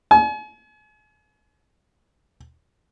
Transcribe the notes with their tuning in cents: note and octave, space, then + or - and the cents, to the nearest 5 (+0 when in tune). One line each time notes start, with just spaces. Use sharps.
G#5 +40